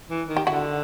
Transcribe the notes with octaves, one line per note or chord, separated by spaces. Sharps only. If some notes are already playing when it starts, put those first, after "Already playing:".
E3
D#3
G4
D3 E4 F#4